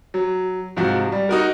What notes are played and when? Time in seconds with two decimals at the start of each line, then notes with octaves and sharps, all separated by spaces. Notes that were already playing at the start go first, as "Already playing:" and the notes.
0.14 F#3
0.77 G#2 C3 F3 F#4
1.12 G3
1.29 D#4 F#4 A#4